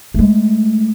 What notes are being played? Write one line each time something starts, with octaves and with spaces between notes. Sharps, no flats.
G#3 A3